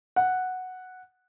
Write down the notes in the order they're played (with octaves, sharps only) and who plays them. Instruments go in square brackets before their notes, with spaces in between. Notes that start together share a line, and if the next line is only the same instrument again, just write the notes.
[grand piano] F#5